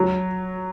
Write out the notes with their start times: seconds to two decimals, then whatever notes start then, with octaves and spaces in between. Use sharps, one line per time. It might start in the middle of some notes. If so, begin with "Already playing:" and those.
Already playing: F#3